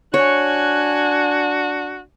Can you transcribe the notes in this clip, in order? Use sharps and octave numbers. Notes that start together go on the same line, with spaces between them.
D4 F#4 C#5 G#5 F#6